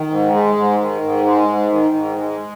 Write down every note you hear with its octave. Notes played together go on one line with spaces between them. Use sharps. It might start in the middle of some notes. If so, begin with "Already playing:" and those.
Already playing: D#3
G#2
G#3
G#2
D#3
G#2
G#3
G#2
D#3
G#2
G#3